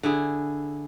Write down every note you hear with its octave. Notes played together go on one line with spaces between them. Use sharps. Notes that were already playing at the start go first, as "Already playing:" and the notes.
D3 E4 G#4